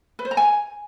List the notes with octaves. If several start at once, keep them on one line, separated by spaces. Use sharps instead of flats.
B4
C5
A#5
G#5